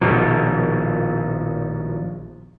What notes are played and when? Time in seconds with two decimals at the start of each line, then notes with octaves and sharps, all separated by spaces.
0.01 A#1 B2 D#3 F3